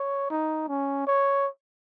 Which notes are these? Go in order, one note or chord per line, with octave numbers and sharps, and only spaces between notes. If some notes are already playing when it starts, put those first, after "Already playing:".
Already playing: C#5
D#4
C#4
C#5